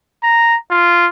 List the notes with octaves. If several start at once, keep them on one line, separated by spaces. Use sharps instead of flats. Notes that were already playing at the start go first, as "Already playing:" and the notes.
A#5
F4